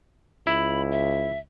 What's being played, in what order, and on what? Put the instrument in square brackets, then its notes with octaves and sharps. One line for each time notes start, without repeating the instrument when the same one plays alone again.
[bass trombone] C#2 [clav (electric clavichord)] E4 [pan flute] B5
[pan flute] E5